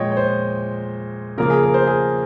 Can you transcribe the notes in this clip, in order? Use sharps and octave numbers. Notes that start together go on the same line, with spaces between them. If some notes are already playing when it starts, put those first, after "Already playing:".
Already playing: A#2 F3 G#3 C#5 D#5 G5
C#5
C5
C#3 F3 A#3 A#4
G#4
A#4
C5
G#4